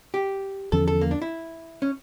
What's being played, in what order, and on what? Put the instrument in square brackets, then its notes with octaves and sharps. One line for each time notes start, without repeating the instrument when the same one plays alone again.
[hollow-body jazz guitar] G4
[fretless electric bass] E2 D3 F3 C#4 [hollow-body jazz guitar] A4
[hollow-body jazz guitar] A4
A#3
D4
E4
C#4